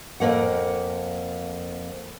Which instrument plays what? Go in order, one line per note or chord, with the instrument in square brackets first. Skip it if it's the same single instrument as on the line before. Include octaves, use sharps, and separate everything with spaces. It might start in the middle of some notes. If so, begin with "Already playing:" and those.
[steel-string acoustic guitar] F2 G#3 A#3 F#5